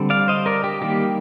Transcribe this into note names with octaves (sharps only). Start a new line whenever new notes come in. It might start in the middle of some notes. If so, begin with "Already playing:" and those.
Already playing: D3 G3 C4
D5 F5
C5 D#5
A#4 D5
G4
D#3 G3 A#3 G4